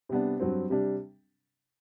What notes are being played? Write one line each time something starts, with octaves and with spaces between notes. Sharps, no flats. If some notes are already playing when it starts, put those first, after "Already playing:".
C3 G3 B3 D4
G2 F#3 C4
C3 G3 D4